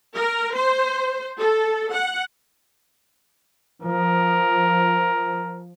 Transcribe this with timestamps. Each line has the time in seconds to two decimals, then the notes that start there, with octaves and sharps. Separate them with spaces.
0.16 A#4
0.56 C5
1.39 A4
1.92 F#5
3.83 F3 A#4